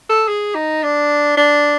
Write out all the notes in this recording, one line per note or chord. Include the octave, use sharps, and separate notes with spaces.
A4
G#4
D#4
D4
D4